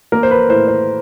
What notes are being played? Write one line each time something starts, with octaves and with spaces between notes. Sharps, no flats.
A#3 A#4
C5
B4
A2 C5
C5